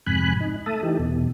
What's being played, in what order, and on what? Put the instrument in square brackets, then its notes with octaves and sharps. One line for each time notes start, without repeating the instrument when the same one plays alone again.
[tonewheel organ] F2 G#2 C3 G#5 B5 F#6
D#4
A3 E5 A5 D#6
E3 D#4 G4
E2 B2